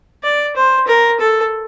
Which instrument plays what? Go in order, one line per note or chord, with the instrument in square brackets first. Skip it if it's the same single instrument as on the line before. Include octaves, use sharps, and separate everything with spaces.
[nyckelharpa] D5
C5
A#4
A4